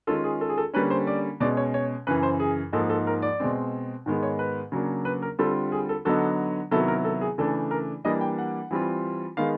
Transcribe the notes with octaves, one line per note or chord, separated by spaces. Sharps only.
D#3 G#3 C#4 F4 A4
G#4
A4
G#4
A4
D3 G3 A#3 C#4 B4
C5
D5
B2 G#3 C#4 D5
C#5
C#5
F#2 C#3 E3 B4
C5
G#4
G#2 F3 A#3 D#4 A4
A4
A#4
D5
B2 G#3 C4
G#2 D#3 G#3 B3
C#5
B4
C#3 F#3 A#3 D4
B4
A#4
D3 G3 C4 F4 A4
G#4
A4
D3 F#3 B3 D#4 A4
C3 D#3 F#3 B3 E4 A4
A#4
A4
G#4
C#3 E3 A3 D4 A4
A#4
E3 G3 A#3 D4 D#5
G5
F#5
E3 G3 C4 F4
D#3 G#3 B3 F5